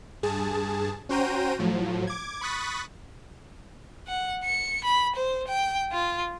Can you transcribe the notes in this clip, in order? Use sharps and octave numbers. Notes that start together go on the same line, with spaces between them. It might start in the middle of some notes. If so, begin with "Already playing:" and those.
G2 G#4 A5
C#4 F#4 C5 G5 A#5 D#7
A2 F3 F#3
D6 G#6
B5 C#6 D#6 F#6 A6 B6
F#5
C#7
B5
C5
G5
F4